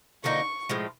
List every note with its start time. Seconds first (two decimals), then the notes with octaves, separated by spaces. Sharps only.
0.24 D3 F3 A#3 D#4 C#6
0.69 A2 F3 G#3